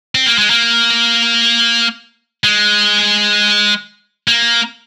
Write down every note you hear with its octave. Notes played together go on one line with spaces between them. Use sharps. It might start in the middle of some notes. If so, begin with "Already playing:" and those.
C4
A#3
G#3
A#3
G#3
A#3